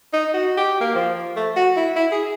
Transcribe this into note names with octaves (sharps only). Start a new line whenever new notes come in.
D#4
F#4
G4
A#3
F3
A3
F#4
E4
E4
G#4